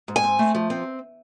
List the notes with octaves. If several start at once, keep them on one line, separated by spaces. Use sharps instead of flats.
G#2
G#5
C4
A3
F3
C4